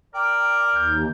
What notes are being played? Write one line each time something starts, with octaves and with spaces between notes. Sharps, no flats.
A#4 D5 G5
D#2 G6